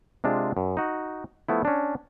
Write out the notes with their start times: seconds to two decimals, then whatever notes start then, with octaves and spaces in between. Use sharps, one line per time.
0.24 C3 G#3 D4 F4
0.57 F#2
0.77 D#4 F#4
1.48 F3 A3 B3 E4
1.65 C#4 D4